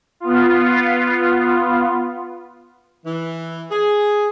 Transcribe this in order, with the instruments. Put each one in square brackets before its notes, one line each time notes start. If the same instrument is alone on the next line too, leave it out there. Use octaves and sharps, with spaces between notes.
[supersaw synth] B3 F4
[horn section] E3
G#4